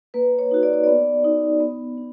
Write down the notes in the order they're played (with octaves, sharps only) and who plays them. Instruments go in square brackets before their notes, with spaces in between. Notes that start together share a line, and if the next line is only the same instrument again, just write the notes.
[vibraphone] A#3 B4
C#5
D#4 F#4
D5
C#5
B3 D5
D#4 F#4
B3
D4